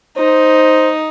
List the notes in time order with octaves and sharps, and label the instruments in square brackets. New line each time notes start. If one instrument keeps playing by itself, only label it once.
[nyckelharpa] D#4 [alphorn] C5